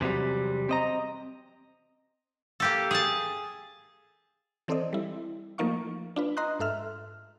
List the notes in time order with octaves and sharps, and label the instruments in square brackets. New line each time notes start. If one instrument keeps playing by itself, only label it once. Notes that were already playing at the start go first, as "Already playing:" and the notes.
[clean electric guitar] E2 C3 F#3 G3
C4 D#5 A#5
[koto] A#3 G4 A4
G#4 A5
[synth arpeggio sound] E3 C4 A4 C5 D5 D#5
G3 E4
F3 A3 A#3 D#4 F5 C#6
D4 F4 B4
D#5 A#5 C6 D#6 F#6
G#2 A4 E5 F6